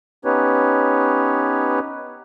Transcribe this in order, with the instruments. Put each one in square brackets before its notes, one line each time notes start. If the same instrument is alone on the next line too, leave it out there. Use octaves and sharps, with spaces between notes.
[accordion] B3 C#4 D#4 G4 B4 C#5